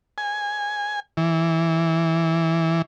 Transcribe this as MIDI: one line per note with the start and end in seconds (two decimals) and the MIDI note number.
0.18 1.00 80
1.17 2.82 52